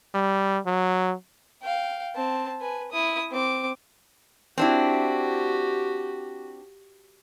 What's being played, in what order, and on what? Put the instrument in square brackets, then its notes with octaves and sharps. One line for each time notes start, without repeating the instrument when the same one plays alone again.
[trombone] G3
F#3
[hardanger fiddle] F5 G5
C4 A5
B4 G#5
E4 D#6
C4 D6
[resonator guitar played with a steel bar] C4 D4 E4 [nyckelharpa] F#4 G4